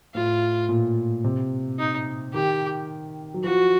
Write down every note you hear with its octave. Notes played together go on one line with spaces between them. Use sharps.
A2 F4
A#2
C3
D#4
D#3 G4
F#3
F3 F#4